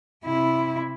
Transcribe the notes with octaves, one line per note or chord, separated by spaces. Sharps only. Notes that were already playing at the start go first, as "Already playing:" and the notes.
C3 E4